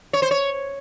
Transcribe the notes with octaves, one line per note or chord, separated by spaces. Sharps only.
C#5
C5
C#5